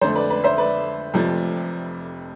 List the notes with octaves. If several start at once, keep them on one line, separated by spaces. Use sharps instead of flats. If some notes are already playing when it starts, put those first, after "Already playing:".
F2 D3 A3 A4 C5
B4 D5
B4 D5
C5 E5
B4 D5
F1 F2 C3 F3 A3